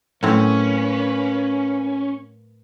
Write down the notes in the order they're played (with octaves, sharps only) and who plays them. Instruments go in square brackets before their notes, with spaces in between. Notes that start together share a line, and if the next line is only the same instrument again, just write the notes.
[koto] A2 F#3 C4 [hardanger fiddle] A#3 B4 [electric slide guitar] C#4